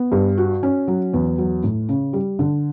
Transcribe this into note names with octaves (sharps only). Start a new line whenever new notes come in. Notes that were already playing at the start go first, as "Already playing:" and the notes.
Already playing: B3
G2
F#4
C#4
F#3
E2
F#3
A2
C#3
G3
D3